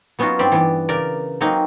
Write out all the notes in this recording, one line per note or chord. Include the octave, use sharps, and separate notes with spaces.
F#3 B3 C#4 D#4 F4 F#4
G2 C4 C5 D5 B5
E3 B3 D5
C#3 A#4 D5
F#3 A#3 C4 C#4 D#4